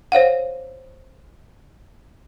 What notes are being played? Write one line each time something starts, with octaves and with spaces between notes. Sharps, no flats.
C5 C#5 F5 F#5